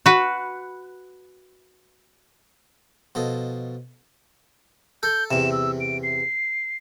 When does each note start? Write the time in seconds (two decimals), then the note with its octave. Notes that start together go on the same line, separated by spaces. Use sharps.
0.06 F#4 B4
3.15 B2 F3 A4 D#5
5.03 A4 G6
5.31 E2 C3 E7
5.52 E6
5.80 D7
6.03 C7